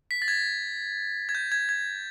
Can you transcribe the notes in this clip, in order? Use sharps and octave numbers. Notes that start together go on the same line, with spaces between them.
B6
A6
G#6
G#6
G6
G#6
G#6